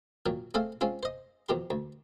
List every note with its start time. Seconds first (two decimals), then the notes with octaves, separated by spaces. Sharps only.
0.26 A#2 D#3 F#3
0.54 A3 C4 G#4 A4 C5 F5
0.81 G#3 C4 C#4 F4
1.03 C5 D#5
1.49 F2 B2 D#3 G4 C6
1.70 D2